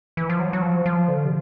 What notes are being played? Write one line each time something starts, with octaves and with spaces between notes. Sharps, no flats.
E3
F3
F#3
F#3
F3
F3
D3
C3